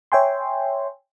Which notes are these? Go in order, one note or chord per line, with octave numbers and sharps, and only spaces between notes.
C#5 E5 G5 G#5 C6